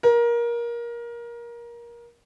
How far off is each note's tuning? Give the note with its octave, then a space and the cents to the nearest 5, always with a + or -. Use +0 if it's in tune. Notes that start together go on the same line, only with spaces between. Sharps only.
A#4 +20